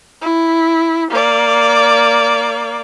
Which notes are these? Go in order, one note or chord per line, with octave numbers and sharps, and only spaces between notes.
E4
A#3 D5